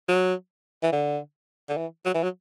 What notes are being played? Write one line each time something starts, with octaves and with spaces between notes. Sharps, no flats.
F#3
E3
D3
D3
E3
F#3
E3
F#3